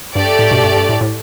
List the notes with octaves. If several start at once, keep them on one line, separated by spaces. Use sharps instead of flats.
G2 A3 G4 D5
A2
G2 B2
G2
G2
A2
A2